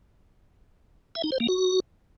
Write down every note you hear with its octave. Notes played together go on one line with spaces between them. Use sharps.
E5
D#4
C5
A#3
F#4